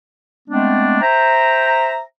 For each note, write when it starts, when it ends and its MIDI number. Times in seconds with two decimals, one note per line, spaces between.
0.49 0.98 56
0.49 0.98 57
0.49 0.98 59
0.49 0.98 60
0.49 0.98 62
1.01 2.00 72
1.01 2.00 76
1.01 2.00 79
1.01 2.00 82